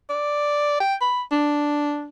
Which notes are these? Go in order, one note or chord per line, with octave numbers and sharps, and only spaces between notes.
D5
G5
B5
D4